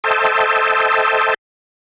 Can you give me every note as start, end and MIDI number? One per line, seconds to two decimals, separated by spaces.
0.04 1.34 69
0.04 1.34 72
0.04 1.34 75
0.04 1.34 76
0.04 1.34 79
0.04 1.34 81